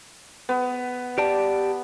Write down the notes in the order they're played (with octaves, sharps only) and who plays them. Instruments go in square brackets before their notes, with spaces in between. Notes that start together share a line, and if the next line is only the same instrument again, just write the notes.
[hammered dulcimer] B3
[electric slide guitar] G4 D5 A5